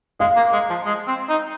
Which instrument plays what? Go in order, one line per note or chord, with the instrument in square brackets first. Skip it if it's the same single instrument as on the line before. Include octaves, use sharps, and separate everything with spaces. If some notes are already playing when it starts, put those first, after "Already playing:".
[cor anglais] G#3 [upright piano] F5
[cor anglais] A#3
G#3
F3
G#3
C4
D#4